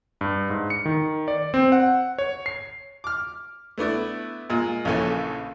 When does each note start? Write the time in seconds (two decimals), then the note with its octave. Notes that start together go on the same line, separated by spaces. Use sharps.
0.21 G2
0.50 G#2
0.70 C#7
0.85 D#3
1.28 D5
1.54 C4
1.72 F#5
2.18 C#5
2.46 C7
3.04 D6 F6
3.77 A3 B3 D4 E4
4.50 A#2 G#3
4.85 A#1 C#3 E3 C#4 A4